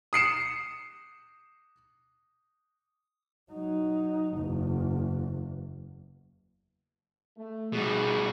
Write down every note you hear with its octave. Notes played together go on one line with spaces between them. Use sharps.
D#6 C7 C#7 E7
F#3 D#4
F#1 E2
A3
B2 G3 D#4 F#4 G#4